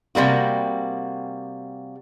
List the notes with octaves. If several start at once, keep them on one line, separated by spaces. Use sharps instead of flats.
C3 G3 A#3 F#4